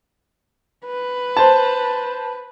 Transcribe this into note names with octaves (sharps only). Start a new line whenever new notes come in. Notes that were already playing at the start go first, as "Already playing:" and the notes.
B4
C5 A5